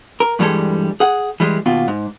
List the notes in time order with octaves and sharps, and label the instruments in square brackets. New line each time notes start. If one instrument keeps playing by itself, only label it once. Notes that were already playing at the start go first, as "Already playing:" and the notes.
[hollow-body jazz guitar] A#4
G2 E3 G3 G#3 A4
G#4 F#5
E3 G3 G#3
D#2 B2 F4
G#2